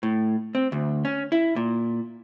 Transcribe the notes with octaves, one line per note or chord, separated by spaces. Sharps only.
A2
C4
D2
C#4
E4
A#2